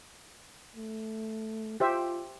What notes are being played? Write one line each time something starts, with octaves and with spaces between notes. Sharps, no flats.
A3
F4 G4 C5 E5